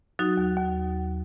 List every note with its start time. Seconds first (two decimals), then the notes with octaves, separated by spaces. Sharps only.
0.19 F#3 D#4 F#4
0.37 D#2
0.57 D#2